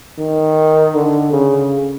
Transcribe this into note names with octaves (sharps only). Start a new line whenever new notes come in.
D#3
D3
C#3